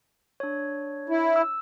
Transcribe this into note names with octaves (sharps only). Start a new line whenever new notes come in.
D4 C#5
E4
E6